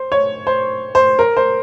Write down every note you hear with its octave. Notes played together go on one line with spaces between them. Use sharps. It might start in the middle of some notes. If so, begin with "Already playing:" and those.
Already playing: C5
C#5
C5
C5
A#4
C5